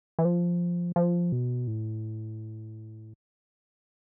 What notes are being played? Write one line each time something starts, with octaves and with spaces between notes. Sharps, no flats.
E3
F3
F3
B2
A2